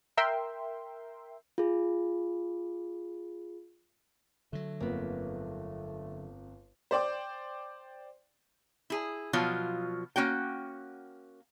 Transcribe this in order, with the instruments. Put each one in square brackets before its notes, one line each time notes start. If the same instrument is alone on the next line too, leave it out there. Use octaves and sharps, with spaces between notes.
[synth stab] A#4 E5 G5 C6
[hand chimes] F4 G#4
[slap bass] D3 F#3 [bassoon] A3
[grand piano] G1 F2 [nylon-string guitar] A#3 B3
[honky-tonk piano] C5 D5 G5 D6
[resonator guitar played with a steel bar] E4 G#4
B2 F3 F#3 F4
A#3 C#4 F#4 G5